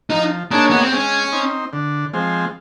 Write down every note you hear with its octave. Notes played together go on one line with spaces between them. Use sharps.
F3 D#4
A#3 D4 D#4 G#4 C#5
B3
C4
G#3 C#4
C4 D#4
D3
F3 G#3 C4